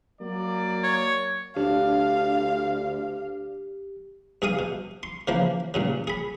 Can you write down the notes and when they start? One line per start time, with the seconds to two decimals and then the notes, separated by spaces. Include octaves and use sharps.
0.21 F#3 A#3 D5
0.83 C#5
1.56 D2 D4 G4 F5
4.42 G2 G#4 F5 D#6
4.59 B2
5.03 C6
5.28 C#3 E3 F3 A#3
5.74 G2 A#2 C#3
6.07 G#4 B5